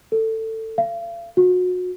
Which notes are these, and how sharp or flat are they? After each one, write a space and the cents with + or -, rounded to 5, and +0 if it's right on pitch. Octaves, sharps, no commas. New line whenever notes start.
A4 +20
F5 -40
F#4 -30